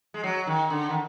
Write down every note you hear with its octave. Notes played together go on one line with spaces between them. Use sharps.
G#3
F#3
D#3
D3
D#3